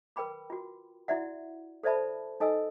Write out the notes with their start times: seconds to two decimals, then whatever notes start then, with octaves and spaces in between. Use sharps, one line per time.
0.16 A#4 B4 G5 B5 D6
0.50 F4 F#4
1.08 E4 F#4 D5 E5 F#5
1.83 A4 C5 D5 E5 A5 B5
2.40 D#4 A4 D#5 G#5 E6